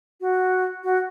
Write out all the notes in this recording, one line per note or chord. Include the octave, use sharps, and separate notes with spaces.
F#4
F#4